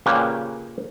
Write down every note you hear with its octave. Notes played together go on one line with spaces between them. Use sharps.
A#2 C#3 A#3 C#4 G4 B4